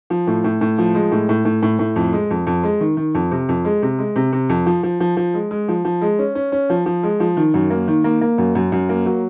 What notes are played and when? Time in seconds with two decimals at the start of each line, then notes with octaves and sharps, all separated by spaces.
0.10 F3
0.27 A2
0.44 A2
0.61 A2
0.78 F3
0.95 G#3
1.12 A2
1.29 A2
1.45 A2
1.62 A2
1.79 A2
1.96 F2
2.13 G#3
2.30 F2
2.47 F2
2.63 G#3
2.80 D#3
2.97 D#3
3.15 F2
3.31 C3
3.49 F2
3.65 G#3
3.82 C3
3.99 G#3
4.16 C3
4.33 C3
4.49 F2
4.66 F3
4.83 F3
5.00 F3
5.17 F3
5.34 G#3
5.51 G#3
5.68 F3
5.85 F3
6.02 G#3
6.19 C#4
6.35 C#4
6.52 C#4
6.70 F3
6.86 F3
7.03 G#3
7.20 F3
7.37 D#3
7.54 F#2
7.70 A#3
7.88 D#3
8.04 A#3
8.21 A#3
8.38 F#2
8.55 F#2
8.72 F#2
8.89 A#3
9.06 F#3